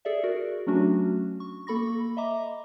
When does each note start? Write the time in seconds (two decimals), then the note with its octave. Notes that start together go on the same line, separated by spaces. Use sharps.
0.05 G#4 A4 D5 E5
0.24 F#4 A#4
0.67 F#3 A3 C#4 D4 F#4
1.40 C#6
1.67 A#3 A4 B5 C#6 A#6
2.17 D#5 E5 A#5 D6